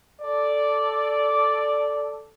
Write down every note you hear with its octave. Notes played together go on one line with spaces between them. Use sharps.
A4 D5